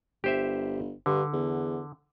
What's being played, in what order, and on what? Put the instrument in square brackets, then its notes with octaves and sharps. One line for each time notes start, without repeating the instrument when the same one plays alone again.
[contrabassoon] G1 [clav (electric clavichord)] G4 C5 E5
[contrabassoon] G2 [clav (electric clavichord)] D3
[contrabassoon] E2